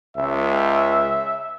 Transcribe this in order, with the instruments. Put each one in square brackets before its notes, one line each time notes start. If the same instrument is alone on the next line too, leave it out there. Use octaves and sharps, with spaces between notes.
[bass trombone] C#2 [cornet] E5